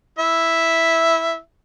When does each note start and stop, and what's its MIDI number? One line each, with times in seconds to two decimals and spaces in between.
0.19 1.38 64
0.19 1.38 76